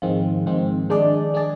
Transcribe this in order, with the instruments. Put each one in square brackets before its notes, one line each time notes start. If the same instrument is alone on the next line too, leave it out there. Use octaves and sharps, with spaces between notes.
[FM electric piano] G#2 D#3 G#3 C4 [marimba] F3
[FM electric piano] G#2 D#3 G#3 C4
[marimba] D#3 [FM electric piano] G#3 D4 G#4 D5
[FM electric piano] G#3 D4 G#4 D5